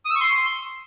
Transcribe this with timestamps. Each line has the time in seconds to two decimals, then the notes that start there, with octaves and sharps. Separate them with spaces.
0.05 D#6
0.10 E6
0.16 C#6
0.21 C6